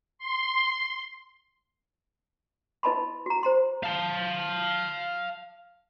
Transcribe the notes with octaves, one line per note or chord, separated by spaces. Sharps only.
C6
E4 B4 D#5 A5 B5 C6
F#4 A#5
C5 A#5 C6
F5 A5